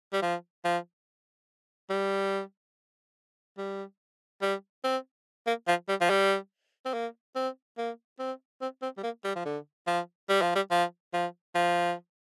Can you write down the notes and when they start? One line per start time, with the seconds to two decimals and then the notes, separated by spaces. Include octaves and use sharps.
0.13 G3
0.22 F3
0.64 F3
1.90 G3
3.58 G3
4.42 G3
4.84 C4
5.47 A#3
5.68 F3
5.88 G3
6.01 F3
6.10 G3
6.85 C4
6.94 A#3
7.35 C4
7.78 A#3
8.19 C4
8.61 C4
8.82 C4
8.97 G3
9.03 A#3
9.24 G3
9.35 F3
9.45 D3
9.87 F3
10.29 G3
10.42 F3
10.55 G3
10.71 F3
11.13 F3
11.55 F3